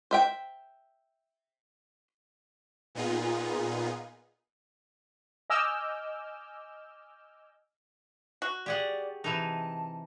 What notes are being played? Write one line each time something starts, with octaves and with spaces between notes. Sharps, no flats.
C5 E5 G5
A#2 B3 D#4 F4 G#4
D#5 G#5 D6 E6 F6 G6
F#4
G4 G#4 D5 F#5
C3 E3 D#4 A5